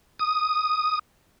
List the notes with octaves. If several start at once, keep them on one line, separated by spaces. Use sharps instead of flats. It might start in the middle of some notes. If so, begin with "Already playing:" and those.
D#6